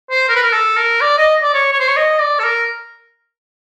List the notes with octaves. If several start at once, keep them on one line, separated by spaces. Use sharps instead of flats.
C5
A#4
B4
A#4
A4
A#4
D5
D#5
D5
C#5
C#5
C5
C#5
D#5
D5
A4
A#4